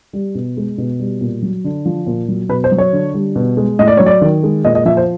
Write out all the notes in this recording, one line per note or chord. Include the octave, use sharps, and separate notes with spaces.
G3
B2
G#3
B2
G3
A#2
F#3
D3
F3
A#2
F#3
B2 B4
C5
F#3
C#5
D3
G3
B2
G#3
A2 D#5
D5
F#3 C#5
D5
D#3
G#3
A#2 D#5
D#5
F3 E5
C5